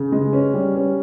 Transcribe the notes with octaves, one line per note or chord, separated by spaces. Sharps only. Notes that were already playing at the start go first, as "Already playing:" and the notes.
Already playing: C#3
G#3
C#4
G3
C#4